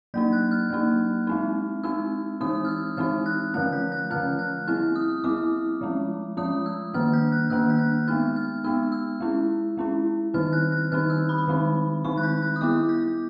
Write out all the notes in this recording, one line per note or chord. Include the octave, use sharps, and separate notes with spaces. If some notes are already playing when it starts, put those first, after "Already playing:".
F#3 A#3 D#4 G6
F#6
F6
F#3 A#3 D#4
G#3 C4 D#4
G#3 C4 D#4 E6
E3 G#3 C4 D#4 D#6
F6
E6
E3 G#3 C4 D#4 F6
F#6
D3 F3 A3 C#4 F#6
G6
F#6
D3 F3 A3 C#4 F6
F#6
G3 C4 E4 F6
D#6
G3 C4 E4 D6
F3 G#3 C#4
F3 G#3 C#4 D#6
E6
D#3 G3 A#3 D4 F6
G6
F#6
D#3 G3 A#3 D4 E6
G6
F#6
G#3 B3 D#4 F6
F6
G#3 B3 D#4 E6
E6
G#3 C#4 E4
G#3 C#4 E4
D#3 G3 C4 D#4 F6
F#6
F#6
D#3 G3 C4 D#4 F6
E6
B5
D#3 G#3 C4 D#4
D#3 G#3 C4 D#4 C#6
F#6
G6
F#6
D#6
G3 B3 E4 D6
G6